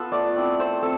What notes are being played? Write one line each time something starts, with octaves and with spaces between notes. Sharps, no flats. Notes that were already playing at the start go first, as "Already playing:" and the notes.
Already playing: B3 F4 A4 B4
A3 D5
C4 E4
A3 C5
C4 A4